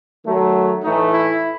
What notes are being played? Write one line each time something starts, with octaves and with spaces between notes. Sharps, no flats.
D#3 F#3 A3
A2 E3 A3 D#4
E4